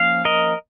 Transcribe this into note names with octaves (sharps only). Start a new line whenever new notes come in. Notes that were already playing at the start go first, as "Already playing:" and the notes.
Already playing: F3 A#3 C#4 F5
A#4 D#5